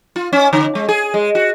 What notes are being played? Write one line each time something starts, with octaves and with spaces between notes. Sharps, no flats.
F4
C#4
D3
G#3
G#4
G#3
F#4